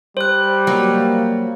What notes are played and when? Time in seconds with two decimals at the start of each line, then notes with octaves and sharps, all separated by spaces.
0.17 G3 C5 F#6
0.67 F#3 A#3